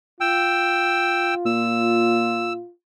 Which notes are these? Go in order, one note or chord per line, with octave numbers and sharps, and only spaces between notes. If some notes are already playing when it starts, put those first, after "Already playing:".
F4 G5 E6
A#2 E6